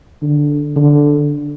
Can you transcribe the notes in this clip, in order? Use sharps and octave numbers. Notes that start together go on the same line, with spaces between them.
D3
D3